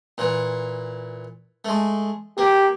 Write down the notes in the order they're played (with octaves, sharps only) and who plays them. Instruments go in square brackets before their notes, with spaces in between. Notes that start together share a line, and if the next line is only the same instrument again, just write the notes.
[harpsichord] A#2 E3
G#3 A3
[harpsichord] A#3 [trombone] G4